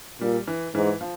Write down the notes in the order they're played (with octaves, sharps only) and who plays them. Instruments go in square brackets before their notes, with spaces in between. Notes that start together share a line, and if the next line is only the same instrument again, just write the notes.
[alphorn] A#2 [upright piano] G3
[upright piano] E3
[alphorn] G#2 [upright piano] E3
[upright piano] F3